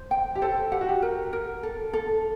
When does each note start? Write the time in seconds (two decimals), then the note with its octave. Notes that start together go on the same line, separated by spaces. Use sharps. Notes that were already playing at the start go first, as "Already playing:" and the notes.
Already playing: C5
0.11 G5
0.35 G4
0.42 A4 C5
0.72 G4 F#5
0.81 F#4
0.89 G4
1.02 A#4
1.33 A#4
1.63 A4
1.93 A4